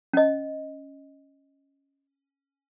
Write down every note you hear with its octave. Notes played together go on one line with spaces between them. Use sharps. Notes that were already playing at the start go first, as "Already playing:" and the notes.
C#4 D#5